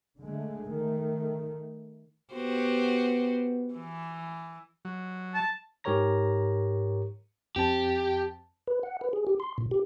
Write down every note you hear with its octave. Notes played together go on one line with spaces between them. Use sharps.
D3 G#3 A3
D#3 A3
B3 F#4 G4 C5
E3
F#3
A5
G#2 G4 A#4 C#5 A#5 A#6
F2 C4 G4 A5
B4
F#5
B4
G#4
G4
C6
A#2
G4